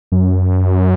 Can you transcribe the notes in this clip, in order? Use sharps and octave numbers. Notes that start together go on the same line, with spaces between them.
F#2